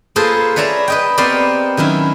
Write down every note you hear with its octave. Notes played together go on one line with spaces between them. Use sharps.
A#3 F4 G#4 A4 B4 C5
B4 C#5 D5 E5 A#5
B4 D#5 G5
B3 C4 G4 A#4 C5 D5
D#3 F#3 C#4 E4